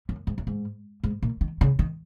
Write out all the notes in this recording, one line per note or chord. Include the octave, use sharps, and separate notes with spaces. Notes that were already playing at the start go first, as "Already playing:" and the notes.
F#2
G#2
F#2
G#2
G#2
A#2
D#3
C#3
D#3